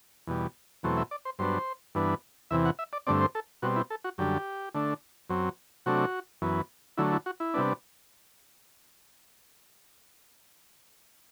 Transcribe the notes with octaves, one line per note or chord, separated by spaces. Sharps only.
E2 B2 G3
E2 B2 F#3 A3 C4
E5
D5
C5
G2 F#3 B3 D4 C5
G2 E3 B3 D4
E2 C3 E3 E5
F#5
E5
D5
G2 D3 A3 C4 D5
C5
A4
B2 G3 C4 F#4
E4
A4
F#4
F#2 D3 G3 G4
D3 A3 D4
F#2 F#3 C4
C3 F#3 A3 D4 F#4
F#2 E3 B3
D3 F#3 A3 E4
E4
F#4
E4
C3 G3 B3 D4